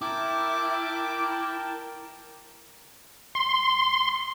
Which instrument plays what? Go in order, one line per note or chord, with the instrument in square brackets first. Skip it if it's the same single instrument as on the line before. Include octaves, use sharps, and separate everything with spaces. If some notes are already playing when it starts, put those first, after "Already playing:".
[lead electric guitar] E4 [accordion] A#4 G5 A5 [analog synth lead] D6
[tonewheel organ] C6